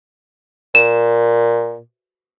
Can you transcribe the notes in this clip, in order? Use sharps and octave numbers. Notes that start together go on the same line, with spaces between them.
A#2 E7